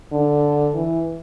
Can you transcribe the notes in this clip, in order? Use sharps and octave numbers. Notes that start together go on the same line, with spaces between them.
D3
E3